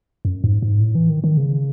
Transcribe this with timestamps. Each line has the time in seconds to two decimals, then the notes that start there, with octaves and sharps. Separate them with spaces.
0.25 F#2
0.44 G#2
0.62 G#2
0.80 A2
0.95 E3
1.10 D#3
1.24 D#3
1.37 C#3